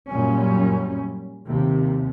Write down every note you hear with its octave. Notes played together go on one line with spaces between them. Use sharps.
F#2 A#2 G3 C#4
D#2 C3